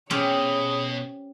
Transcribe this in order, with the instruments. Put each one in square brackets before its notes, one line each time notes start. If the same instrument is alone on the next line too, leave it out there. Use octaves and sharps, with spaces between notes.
[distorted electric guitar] B2 [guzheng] C4 C#4 G4 [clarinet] G#4 [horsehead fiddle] C#5